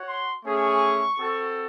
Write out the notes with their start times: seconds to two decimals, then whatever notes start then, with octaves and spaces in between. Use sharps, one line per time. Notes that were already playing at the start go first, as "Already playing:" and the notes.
Already playing: F#4 C#5 F#5
0.08 C6
0.45 A3 C#4 G#4 C#6
1.18 C4 F#4 A4